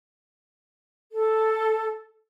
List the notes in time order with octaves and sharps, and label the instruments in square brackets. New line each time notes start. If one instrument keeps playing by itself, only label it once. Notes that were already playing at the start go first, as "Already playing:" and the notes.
[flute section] A4